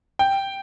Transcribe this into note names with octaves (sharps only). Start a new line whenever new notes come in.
G5